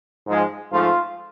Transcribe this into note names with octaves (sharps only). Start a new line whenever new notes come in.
G#2 F3 G#3
G#2 F3 A3 F4